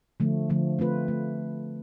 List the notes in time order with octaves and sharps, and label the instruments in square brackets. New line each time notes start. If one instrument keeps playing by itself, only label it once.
[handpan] D3 F3 A3
D3 F3 A3
A3 C4 F4 B4
A3